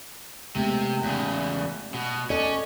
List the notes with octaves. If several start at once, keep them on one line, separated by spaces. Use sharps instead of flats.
C3 G#3 A3 B3
E2 C#3
B2
C#4 A4 D5 D#5